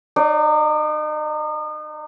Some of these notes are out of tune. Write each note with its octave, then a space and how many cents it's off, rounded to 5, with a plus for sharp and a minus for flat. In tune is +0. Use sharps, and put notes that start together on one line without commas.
D#4 -35 D5 +0